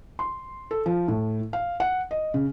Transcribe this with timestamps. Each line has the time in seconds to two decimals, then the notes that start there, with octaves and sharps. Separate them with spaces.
0.19 C6
0.71 A4
0.86 F3
1.08 A2
1.53 F5
1.80 F#5
2.11 D#5
2.34 C#3